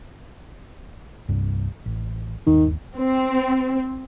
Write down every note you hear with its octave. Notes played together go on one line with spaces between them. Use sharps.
C2 G2
A1
G1 D#2 D#3
C4